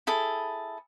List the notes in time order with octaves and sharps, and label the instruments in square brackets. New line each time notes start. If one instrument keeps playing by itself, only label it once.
[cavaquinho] E4 G#4 A4